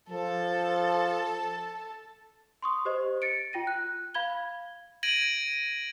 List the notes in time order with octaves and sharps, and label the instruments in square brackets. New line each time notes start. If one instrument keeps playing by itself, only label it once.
[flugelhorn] F3 [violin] A4 A5
[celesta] C6 C#6 D#6
G4 C5 D#5
A6 C#7 D7
F4 G5 A#6 D#7
F#6
F5 B5 G#6 G7
[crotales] G#6 A#6 D7 D#7 F#7